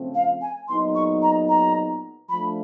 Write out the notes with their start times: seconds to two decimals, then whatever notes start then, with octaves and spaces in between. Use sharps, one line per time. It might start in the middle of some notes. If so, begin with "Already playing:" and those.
Already playing: C#3 F3 A3 C4
0.15 F5
0.42 G#5
0.68 A#2 F#3 B3 D#4 G#4 C6
0.95 C#6
1.22 A#5
1.49 A#5
2.29 F3 A3 D4 B5